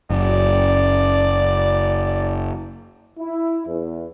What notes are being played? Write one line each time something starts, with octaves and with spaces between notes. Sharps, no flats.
F#1 D5
E4
E2